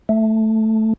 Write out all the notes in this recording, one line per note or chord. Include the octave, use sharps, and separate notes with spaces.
A3